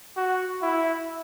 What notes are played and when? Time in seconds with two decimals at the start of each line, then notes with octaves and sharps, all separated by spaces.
0.17 F#4
0.62 E4